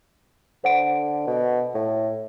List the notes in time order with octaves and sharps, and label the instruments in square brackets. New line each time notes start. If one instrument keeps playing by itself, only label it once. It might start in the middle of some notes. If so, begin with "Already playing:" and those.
[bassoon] D3 [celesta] C5 F#5 D7
[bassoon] B2
A2